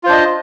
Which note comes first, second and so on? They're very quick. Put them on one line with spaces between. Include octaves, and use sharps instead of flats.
F4 C5 D4 D#5